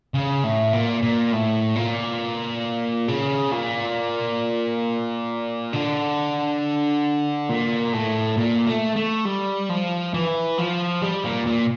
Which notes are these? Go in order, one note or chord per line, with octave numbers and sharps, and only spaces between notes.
C#3
A2
A#2
A#2
A2
A#2
C#3
A#2
D3
A#2
A2
A#2
A3
A3
G3
F3
E3
F3
G3
A#2
A#2